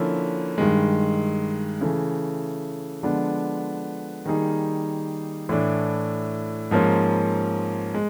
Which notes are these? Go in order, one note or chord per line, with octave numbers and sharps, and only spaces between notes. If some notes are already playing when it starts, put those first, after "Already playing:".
Already playing: D3 F3 A#3 C#4 E4
G2 D#3 G#3
C#3 E3 A3
D3 F3 G#3 B3 D4
D#3 G3 A#3 D#4 G#4
A2 E3 A3 D4
G#2 F3 A#3 C#4
G#3